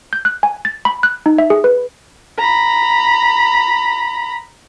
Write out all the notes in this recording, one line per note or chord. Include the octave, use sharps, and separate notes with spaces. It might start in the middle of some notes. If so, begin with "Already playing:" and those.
G6
F#6
G#5
A6
B5
F#6
D#4
E5
G#4
B4
A#5 B5